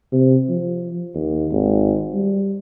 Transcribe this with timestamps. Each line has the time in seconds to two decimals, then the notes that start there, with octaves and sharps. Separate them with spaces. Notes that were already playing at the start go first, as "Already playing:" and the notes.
0.12 C3
0.49 F3
1.15 D#2
1.52 G#1
2.13 G3